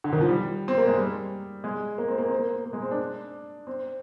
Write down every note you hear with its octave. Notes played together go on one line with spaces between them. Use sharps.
D3
D#3
F3
G3
C4
A#3
G#3
G3
G#3
A#3
C4
A#3
C4
A#3
A#3
G#3
C4
D4
C4